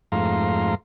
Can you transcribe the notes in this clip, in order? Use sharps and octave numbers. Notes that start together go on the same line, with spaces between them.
F2 G#2 A3 F5 A#5 C6